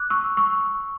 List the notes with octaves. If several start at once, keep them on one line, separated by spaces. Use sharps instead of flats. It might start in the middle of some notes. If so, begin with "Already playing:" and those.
Already playing: D6 F#6
C#6 E6
C#6 E6